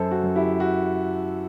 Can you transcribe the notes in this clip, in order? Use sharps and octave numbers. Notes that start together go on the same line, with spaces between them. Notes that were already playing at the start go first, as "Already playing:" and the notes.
Already playing: F#2 A4 C5
F#4
F#2
E4 G4
F#4